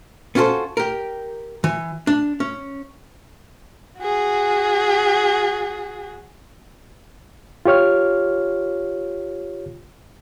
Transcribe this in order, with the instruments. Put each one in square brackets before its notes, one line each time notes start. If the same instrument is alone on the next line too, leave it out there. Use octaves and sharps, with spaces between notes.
[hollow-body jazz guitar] B3 C#4 F4 F#4 A4 C5
G4 A#4
E3
D4
C#4
[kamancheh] F#4 G#4
[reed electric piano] F4 G4 C#5 F6